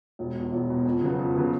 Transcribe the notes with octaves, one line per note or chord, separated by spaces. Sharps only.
E1
E2 B2
E1
E2 B2
F2
C#3 F#3 B3
F2
C#3 F#3 B3